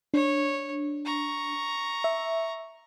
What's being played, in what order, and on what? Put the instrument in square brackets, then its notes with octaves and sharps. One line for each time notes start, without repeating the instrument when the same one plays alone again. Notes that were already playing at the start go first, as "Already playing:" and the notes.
[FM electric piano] D4 [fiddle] C#5
[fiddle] A#5 C#6
[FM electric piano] E5